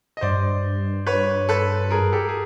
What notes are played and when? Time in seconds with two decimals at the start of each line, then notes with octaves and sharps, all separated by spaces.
0.17 D#5
0.21 G2 C5 D5
1.07 B4 C#5
1.49 A4 B4
1.91 G#4 A#4
2.12 G4 A4
2.29 G#4